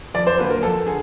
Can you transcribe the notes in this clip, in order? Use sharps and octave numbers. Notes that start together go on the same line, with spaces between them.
F2 D5
C5
D3 F#3 A#3 B4
A#4
F2 A4
D3 G#4